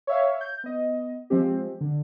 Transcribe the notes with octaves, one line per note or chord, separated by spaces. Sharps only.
C#5 E5 F5
G6
B3 D#5
F3 G#3 C4 G4
D3